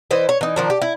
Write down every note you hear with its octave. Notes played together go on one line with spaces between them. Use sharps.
E3 B4 C5 D#5
C#5
E3 D#4
D#3 F3 D4
G4
E4